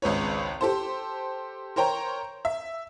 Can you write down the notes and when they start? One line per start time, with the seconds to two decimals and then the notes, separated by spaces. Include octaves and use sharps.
0.02 G#1 C#2 B4 C#5
0.61 G4 A4 C5
1.76 A#4 C5 C#5 G5 A#5
2.45 E5